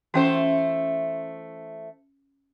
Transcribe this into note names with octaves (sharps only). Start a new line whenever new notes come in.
E3 A3 C#4 F#4 C5